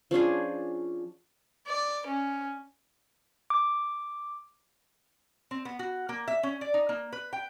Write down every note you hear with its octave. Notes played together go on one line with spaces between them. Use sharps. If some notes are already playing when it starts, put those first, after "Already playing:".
F3 C#4 D4 G#4
D5
C#4
D6
C4
B3
F#4
A#3
E5
C#4
D5
D#4
A#3
B4
G5